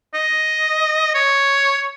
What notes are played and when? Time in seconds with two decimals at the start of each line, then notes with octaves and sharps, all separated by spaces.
0.14 D#5
1.14 C#5